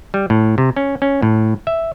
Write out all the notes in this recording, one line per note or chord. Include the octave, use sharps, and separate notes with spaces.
G3
A2
C3
C#4
C#4
A2
E5